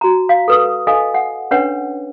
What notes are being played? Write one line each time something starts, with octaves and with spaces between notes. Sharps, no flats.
F#4 A#5
F5
A4 B4 D#6
A4 D#5 F5 G#5
F#5
C#4 D4 B4 C#5 F#5